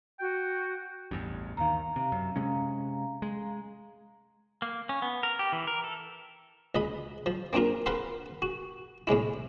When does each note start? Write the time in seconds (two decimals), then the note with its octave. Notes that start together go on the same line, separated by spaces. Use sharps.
0.19 F#4 G5
1.11 A1 E2 G2
1.57 D#2 D#3 F5 A#5
1.96 C3
2.12 F#2
2.36 C3 G#3 C#4
3.22 G#3
4.62 A#3
4.89 C#4
5.02 B3
5.23 A#4
5.39 G4
5.52 E3
5.67 A#4
5.84 A4
6.75 C#2 D#5 B5
7.26 F3
7.53 A#3 C4 D4 F4 A#4
7.86 A#4 B4 F5 F#5 B5 C6
8.42 F#4
9.07 A2 C3 G#3 E4